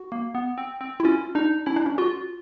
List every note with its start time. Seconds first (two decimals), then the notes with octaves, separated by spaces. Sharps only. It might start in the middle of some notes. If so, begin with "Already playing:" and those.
Already playing: F#4
0.12 A#3
0.35 B3
0.58 C4
0.81 C4
1.00 E4
1.05 C#4 F4
1.35 D4 D#4
1.66 C#4 E4
1.76 D4
1.86 C#4
1.98 F4 F#4